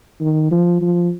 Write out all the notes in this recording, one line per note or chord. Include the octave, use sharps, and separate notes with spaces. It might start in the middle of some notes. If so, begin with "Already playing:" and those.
D#3
F3
F3